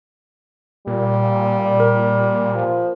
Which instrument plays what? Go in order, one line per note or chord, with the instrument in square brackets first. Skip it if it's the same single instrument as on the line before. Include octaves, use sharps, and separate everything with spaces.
[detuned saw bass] A#2 [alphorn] G3
[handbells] A#4
[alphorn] F3